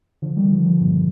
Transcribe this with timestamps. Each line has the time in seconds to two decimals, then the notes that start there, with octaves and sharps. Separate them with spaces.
0.22 D3 F3
0.37 D#3 G3
0.51 D3 F3
0.65 D3 F3
0.80 G2 A#2